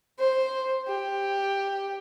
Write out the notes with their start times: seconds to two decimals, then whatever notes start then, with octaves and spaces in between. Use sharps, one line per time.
0.19 C5
0.87 G4